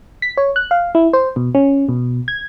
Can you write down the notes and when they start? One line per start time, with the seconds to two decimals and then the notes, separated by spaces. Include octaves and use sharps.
0.22 B6
0.37 C#5
0.56 F#6
0.71 F5
0.95 E4
1.13 C5
1.36 B2
1.55 C#4
1.89 B2
2.28 G#6